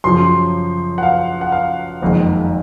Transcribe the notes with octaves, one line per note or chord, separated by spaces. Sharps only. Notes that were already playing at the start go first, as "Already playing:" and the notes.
F#2 C#3 F3 C6
F#5
F5
F#5
F5
F#1 F2 D#3 G#3